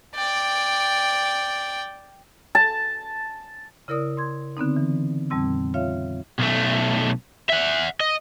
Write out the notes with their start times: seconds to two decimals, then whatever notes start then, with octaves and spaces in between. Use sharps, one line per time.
0.15 D5 G5
2.55 A5
3.88 C#3 E4 A#4 D5 D#6
4.17 C6 G#6
4.57 D3 B3 C4 D#4
4.76 E3
5.30 F2 A#2 G3 C4 E6
5.74 F4 C#5 E5 F5
6.39 B1 A3
7.49 E5 F#5
8.00 D#5